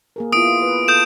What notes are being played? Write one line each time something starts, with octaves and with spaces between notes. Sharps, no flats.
A#3 G#4 A#4
B3 E4 F4 D#6 D7
B4
A4 D#6 G6 E7